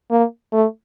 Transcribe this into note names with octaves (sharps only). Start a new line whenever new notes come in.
A#3
A3